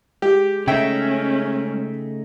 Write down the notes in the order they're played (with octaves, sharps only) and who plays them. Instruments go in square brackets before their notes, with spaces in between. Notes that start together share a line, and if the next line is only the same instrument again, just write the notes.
[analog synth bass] G#3 [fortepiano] G4
[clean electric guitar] C#3 A3 D#4 [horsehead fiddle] C#4 [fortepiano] E5 G5